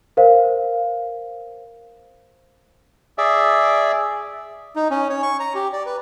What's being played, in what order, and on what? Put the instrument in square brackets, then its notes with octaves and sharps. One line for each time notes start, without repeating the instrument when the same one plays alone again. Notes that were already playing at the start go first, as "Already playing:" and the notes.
[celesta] A#4 C5 F5
[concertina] G#4 D5 E5
D#4
C#4
C#5
C#6
A#5
G4
D5
B4